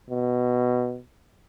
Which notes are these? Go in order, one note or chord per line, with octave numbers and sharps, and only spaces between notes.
B2